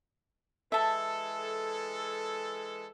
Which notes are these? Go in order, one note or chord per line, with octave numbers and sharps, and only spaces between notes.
E3 G#3 A4 E5 A5